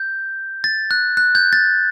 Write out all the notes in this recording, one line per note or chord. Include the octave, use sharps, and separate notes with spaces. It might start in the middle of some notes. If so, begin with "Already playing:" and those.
Already playing: G6
A6
F#6
F#6
G6
A6